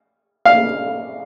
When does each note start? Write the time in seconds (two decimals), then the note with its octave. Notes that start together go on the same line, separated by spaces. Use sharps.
0.45 F5